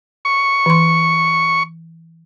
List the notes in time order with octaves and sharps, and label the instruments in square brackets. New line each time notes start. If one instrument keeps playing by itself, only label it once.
[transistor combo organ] C#6
[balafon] E3 C6